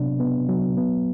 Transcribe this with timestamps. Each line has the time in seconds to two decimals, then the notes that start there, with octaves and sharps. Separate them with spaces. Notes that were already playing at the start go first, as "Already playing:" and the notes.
Already playing: C3 F#3 B3 D4
0.20 B3
0.49 F#3
0.77 B3